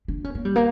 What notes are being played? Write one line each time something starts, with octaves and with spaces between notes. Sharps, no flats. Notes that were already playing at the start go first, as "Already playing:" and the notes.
D4
C#4
A#3
G3
A#3